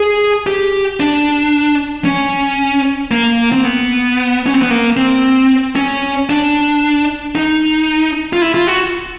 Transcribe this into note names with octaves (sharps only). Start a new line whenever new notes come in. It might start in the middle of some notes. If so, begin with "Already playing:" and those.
Already playing: G#4
G4
D4
C#4
A#3
C4
B3
C#4
C4
B3
A#3
C4
C#4
D4
D#4
F4
E4
F4
F#4